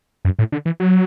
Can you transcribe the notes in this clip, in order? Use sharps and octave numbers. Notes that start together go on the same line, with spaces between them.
F#2
A2
D3
E3
F#3